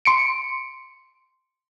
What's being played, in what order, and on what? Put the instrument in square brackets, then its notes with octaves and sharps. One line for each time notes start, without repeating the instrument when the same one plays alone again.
[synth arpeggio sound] C6 C#7 D7